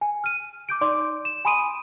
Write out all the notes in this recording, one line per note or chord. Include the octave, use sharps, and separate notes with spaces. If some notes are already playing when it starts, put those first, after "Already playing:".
G#5
F6 D#7
D6 G6 D7
D#4 D5 C6 D6
E7
G#5 B5 C6 D#6 D7 D#7